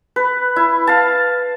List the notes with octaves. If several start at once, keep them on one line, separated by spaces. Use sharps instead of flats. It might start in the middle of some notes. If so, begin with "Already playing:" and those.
B4
E4
F5 A5